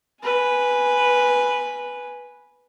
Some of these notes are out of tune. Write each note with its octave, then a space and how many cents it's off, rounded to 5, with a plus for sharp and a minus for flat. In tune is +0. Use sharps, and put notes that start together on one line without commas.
B4 -5 G#5 +0